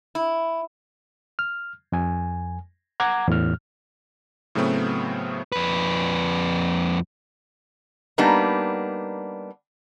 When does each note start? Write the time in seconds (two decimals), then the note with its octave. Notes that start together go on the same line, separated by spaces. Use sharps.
0.15 E4
1.39 F6
1.92 F2 G#5
3.00 F#5 A#5 D6 G#6
3.28 E2 A2 F6
4.55 A2 C#3 F#3 A3 B3 C4
5.52 F2 B4
8.18 G3 A#3 B3 D4 D#4